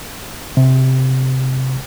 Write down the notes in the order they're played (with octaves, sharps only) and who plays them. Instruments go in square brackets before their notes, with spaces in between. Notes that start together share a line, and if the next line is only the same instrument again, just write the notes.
[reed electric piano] C3